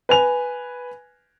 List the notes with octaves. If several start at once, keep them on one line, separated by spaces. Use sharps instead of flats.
B4 G#5 F7